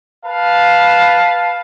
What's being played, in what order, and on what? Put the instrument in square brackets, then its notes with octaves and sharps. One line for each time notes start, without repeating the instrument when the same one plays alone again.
[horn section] B4 F5 A5